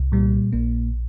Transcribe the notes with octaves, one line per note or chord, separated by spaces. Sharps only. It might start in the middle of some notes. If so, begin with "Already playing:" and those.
Already playing: C2
A#2 G3
A#1 A#3